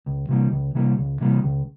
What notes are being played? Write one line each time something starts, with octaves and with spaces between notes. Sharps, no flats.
C#2
C3 E3 G3 A#3
C#2
C3 E3 G3 A#3
C#2
C3 E3 G3 A#3
C#2